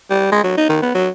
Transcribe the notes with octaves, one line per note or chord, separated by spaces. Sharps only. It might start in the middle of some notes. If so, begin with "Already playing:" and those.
G3
G#3
F#3
D#4
D#3
B3
F#3